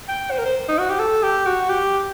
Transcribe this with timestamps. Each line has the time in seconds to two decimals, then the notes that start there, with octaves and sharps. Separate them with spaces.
0.08 G5
0.31 C5
0.38 A#4
0.46 C5
0.69 D#4
0.78 F#4
0.90 G4
1.00 A4
1.23 G4
1.46 F#4
1.69 G4